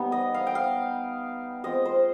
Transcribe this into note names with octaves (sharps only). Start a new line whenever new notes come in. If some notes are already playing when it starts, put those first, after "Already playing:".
Already playing: G3 B3 D#4
D#5
F5
G5
F5
G#3 C4 F4 D#5
C5